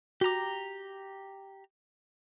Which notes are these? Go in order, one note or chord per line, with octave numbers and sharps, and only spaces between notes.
F#4 G4 A#5 D6